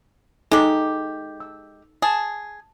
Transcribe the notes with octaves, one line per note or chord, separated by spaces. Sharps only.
G#3 D#4 G4 A4
E6
G#4 A5